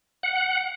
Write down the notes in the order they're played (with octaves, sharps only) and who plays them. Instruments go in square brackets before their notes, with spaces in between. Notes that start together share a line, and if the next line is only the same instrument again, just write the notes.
[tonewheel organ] F#5